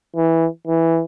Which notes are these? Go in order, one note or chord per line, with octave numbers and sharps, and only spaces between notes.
E3
E3